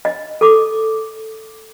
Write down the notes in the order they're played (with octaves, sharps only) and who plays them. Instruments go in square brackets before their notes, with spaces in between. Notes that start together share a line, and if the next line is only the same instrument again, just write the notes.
[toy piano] D#5
A4 D6